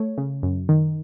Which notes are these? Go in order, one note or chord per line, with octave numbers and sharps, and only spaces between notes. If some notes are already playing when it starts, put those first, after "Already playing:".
Already playing: A3 C#5
C#3
F#2
D#3